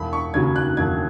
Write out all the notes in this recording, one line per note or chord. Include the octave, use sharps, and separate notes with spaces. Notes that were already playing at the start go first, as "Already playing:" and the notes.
Already playing: E1 B5
C#6
D#2 C#3 F#3 G#6
F#6
E1 G#6